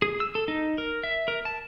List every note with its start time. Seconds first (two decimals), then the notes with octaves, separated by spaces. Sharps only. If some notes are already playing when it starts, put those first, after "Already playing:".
0.02 G#4
0.20 E6
0.35 A4
0.48 D#4
0.78 A#4
1.03 E5
1.28 A#4
1.45 A5